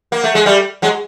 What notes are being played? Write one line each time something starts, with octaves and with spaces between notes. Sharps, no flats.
A#3
A3
G#3
G3 A3
F#3 G#3